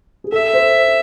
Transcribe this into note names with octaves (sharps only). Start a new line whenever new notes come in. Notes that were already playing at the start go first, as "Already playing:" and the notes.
G#4
A4 E5
C5